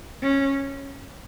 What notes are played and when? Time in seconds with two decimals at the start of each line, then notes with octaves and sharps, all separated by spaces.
0.22 C#4